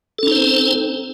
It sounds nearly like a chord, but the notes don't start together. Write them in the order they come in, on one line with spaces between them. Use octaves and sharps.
A4 C#4 D#4 C5 C4